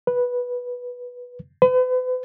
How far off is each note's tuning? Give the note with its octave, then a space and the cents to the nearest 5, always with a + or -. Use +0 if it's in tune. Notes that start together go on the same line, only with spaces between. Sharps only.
B4 -10
B4 +40